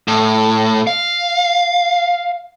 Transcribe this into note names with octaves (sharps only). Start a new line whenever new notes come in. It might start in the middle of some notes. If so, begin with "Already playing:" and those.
A2
F5